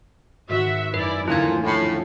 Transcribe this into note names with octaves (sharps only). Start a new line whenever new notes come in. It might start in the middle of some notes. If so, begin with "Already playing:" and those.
G#2 D#3 F#4 E5
F#2 D#4 E4 B4 D5
E2 A#2 D3 F3 A3 C#4 E4 G#6
A2